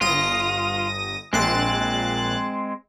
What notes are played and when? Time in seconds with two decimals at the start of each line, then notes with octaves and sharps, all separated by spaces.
0.01 G1 F4 D#6 A#6
1.33 A#1 G#3 C4 F#6 A6